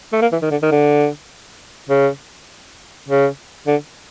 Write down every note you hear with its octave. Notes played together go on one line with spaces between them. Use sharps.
A3
A#3
E3
D#3
D3
D#3
D3
C#3
C#3
D3